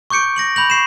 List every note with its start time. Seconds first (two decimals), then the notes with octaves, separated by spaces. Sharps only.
0.10 C#6 D6 G6 C#7 D7
0.36 A#6 D7 F#7
0.56 B5 G6 F#7
0.70 C#6 C7 E7